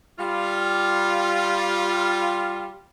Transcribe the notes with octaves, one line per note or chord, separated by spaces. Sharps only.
G3 F4